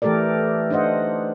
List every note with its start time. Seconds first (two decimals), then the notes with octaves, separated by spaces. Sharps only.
0.02 E3 A3 G4 A4 A#4 D5
0.70 D4 D#4 C5 D#5 F#5